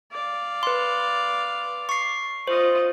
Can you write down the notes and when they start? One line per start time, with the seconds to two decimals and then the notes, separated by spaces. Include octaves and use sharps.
0.11 D5 F5
0.63 B4 C6
1.89 C#6 C7
2.47 F4 C5 D#5